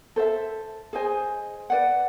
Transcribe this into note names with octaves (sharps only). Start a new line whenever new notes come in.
A4 C5 E5
G#4 C5 D#5 G#5
B4 D5 F#5